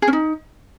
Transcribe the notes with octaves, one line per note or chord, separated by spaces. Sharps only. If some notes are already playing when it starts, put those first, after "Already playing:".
G#4
C#4
D#4